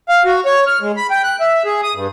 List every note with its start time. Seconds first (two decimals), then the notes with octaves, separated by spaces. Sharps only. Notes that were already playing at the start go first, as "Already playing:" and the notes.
0.09 F5
0.25 F#4
0.46 C#5
0.67 F6
0.81 G#3
0.97 B5
1.11 G5
1.24 F#6
1.40 E5
1.65 G#4
1.83 D#6
1.95 G2